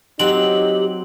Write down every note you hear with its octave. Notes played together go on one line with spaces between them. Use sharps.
F#3 C4 D#4 G4 F#7